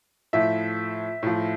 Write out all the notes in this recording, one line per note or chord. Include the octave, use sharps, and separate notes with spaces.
A2 F3 E5
A2 F3